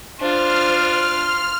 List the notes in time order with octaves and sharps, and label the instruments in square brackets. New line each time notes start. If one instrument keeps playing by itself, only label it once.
[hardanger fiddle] D4 F4 [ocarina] C5 [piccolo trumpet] C6 [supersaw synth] F6